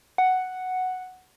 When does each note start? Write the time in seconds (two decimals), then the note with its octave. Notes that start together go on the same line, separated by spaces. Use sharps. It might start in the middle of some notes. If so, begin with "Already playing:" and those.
0.18 F#5